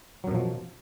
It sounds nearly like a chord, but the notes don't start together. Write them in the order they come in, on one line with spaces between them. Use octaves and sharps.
F#3 F#2 B2 F3